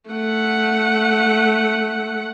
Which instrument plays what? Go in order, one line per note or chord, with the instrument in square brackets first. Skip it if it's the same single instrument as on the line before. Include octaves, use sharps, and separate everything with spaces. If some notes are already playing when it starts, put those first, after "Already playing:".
[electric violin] A3 F#5